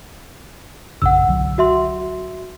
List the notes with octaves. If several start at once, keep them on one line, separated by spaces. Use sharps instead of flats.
A#1 F#2 C#3 F#5 E6
C2 D3 F#3
F#4 E5 C6